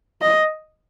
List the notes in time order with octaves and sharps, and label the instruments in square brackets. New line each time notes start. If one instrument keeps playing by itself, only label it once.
[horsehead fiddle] D#5